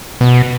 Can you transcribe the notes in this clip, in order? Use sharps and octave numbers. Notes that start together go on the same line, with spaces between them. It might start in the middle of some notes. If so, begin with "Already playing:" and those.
B2